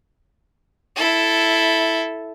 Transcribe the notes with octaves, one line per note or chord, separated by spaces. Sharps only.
E4 A4